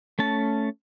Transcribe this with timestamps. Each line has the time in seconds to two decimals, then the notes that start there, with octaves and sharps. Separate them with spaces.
0.19 A3 C#4 A5